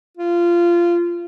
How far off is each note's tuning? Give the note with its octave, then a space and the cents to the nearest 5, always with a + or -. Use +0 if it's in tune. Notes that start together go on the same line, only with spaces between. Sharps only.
F4 -20